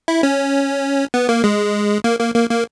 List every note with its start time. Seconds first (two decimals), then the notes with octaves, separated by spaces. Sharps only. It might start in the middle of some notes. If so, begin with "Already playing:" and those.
0.08 E4
0.23 C#4
1.14 B3
1.29 A#3
1.44 G#3
2.04 A#3
2.19 A#3
2.35 A#3
2.50 A#3